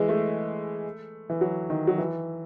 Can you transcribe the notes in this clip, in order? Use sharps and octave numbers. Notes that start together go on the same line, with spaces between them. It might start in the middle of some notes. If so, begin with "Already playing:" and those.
Already playing: E3 G#3
A3
E3
F#3
D#3
F#3
E3